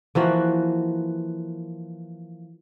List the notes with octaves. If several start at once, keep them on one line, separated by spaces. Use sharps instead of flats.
E3 F3 A#3 F#4